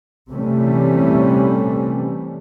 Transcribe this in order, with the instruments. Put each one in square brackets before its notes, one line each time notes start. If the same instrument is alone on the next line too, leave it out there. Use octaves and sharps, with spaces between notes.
[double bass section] C3 E3 G3 A3 C#4